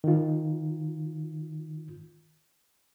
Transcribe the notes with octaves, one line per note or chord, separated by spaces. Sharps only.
D#3 F4